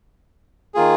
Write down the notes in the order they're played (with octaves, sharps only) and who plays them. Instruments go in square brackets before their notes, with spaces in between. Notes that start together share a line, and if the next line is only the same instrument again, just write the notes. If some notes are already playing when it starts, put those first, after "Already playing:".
[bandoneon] D#3 A#3 F4 G#4